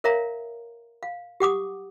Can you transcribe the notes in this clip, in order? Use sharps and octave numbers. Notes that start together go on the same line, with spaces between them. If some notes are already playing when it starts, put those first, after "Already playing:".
A#4 C#5 E5 F5 A#5
F5
G4 F#5 D6 D#6